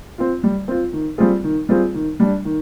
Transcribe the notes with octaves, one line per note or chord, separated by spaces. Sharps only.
C4 F4
G3
C4 F4
D#3
G3 C4 F4 G#4
D#3
G3 C4 F4 G#4
D#3
G3 D4
D#3